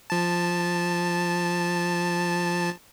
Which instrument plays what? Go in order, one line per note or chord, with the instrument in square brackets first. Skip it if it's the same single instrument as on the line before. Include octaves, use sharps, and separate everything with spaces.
[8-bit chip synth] F3 A5